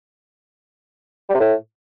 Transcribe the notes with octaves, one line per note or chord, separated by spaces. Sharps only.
G3
C3
A2